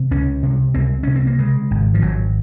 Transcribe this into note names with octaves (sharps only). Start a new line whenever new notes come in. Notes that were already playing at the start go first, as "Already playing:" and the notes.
Already playing: C3
C#2 C#4
C3
C#2 C4
C3 C#4
C4
A#3
C#3 G#3
G#1
F3
G#1 F#3